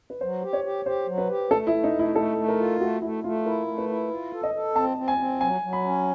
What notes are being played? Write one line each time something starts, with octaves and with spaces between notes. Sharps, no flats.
B4
F#3 C5
G4
C#5
G4
G4 C5
F#3
B4
G4
A3 A4
E4
A3
D#4
A3 E4
A3 A4
A3
A#4
F4
A3 F#4
A3 E4
A3 F4
E4 A#4
A3
B4
E4
F4
A4
D#5
A4
C4 A5
C4
G#5
C4
F#3 G#5
F#3
B5
C#4